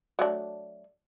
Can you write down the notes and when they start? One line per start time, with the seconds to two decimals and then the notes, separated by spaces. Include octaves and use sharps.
0.19 F#3 A3 D4